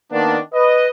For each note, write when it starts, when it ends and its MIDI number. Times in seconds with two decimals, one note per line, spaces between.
0.11 0.37 51
0.11 0.37 58
0.11 0.37 59
0.11 0.37 62
0.53 0.88 71
0.53 0.88 75